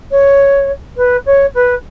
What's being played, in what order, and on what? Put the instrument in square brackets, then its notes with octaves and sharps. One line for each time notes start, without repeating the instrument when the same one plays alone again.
[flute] C#5
B4
C#5
B4